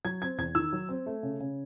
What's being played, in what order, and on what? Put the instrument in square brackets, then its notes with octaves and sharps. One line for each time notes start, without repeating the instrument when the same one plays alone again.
[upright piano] F#3 G#6
C4 G#6
E2 G#6
D#3 E6
F#3
C4
A3
C#3
C#3